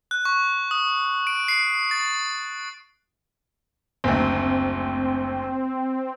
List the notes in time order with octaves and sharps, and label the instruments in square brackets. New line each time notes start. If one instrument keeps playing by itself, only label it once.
[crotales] F#6
C#6
D#6
D7
C7
A6
[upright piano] F#1 D2 [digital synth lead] C4